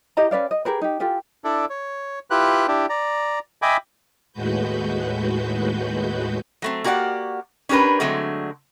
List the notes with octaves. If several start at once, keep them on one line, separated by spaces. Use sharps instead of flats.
E4 G4 D#5 A#5
C#4 B4 D5 F5
D#5
G4 G#4 A#4 B4
D#4 G4
F4 G4 A4 G#5
D4 E4 A4 D5
C#5
E4 F4 G4 B4 F#6
D4 E4 G4
D5 A#5
D#5 E5 G5 G#5 B5 D6
D#2 A2 G#3 F#4 B4 G6
F#3 A3 C4
A#3 F#4 G4 D5 F#5
C#4 D4 G4 A#4 B4
D3 F#3 G#3 A3 C4